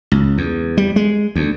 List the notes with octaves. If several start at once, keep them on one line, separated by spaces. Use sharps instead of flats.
C#2
E2
G3
G#3
D2